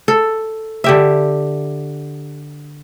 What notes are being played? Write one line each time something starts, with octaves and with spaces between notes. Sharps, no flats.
A4
D3 G4 E5